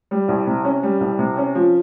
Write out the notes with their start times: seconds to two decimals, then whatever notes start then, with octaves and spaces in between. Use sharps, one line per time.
0.11 G3
0.28 C2
0.47 C3
0.65 C#4
0.83 G3
1.01 C2
1.19 C3
1.37 C#4
1.55 F3